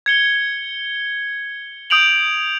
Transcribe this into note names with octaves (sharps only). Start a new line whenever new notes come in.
G#6 C#7 G7
D#6 G6 D7 F7 F#7